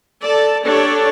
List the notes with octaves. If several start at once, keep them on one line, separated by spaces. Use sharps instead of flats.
A4 D5 A5
D4 G4 A4 C#5 D5